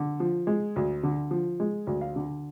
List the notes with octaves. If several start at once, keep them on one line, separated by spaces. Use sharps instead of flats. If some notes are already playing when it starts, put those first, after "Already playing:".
Already playing: D3
F3
G#3
D2
D3
F3
G#3
D2
F5
D3